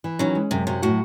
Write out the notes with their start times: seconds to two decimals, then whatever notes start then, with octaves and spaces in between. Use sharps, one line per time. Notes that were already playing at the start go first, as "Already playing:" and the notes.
0.04 E3
0.19 D#3 F#3 C#4
0.35 G#3
0.51 F#2 C3
0.67 C3 F#3
0.82 A2 F#4